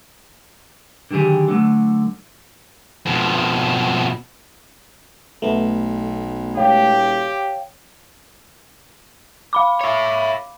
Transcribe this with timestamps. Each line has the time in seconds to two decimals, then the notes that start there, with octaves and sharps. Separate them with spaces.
1.11 D3 D#3 F#3 G4 G#4
1.48 D3 F#3 A3
3.06 F2 B2
5.42 B1 A3 B3
6.57 E1 G4 C#5 F5 G5
9.53 F5 B5 D6
9.81 C#5 E5